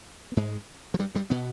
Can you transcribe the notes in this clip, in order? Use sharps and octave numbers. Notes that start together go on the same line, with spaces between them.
B3
G#2 G#3
F3
G2 G3
G2 G3
B2 B3